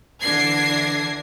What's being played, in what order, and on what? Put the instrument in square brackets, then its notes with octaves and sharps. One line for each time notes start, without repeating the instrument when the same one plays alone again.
[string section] D3 E3 D4 G#6 A#6 C7